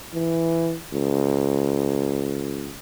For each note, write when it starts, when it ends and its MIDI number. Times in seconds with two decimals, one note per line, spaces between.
0.14 0.76 52
0.93 2.75 37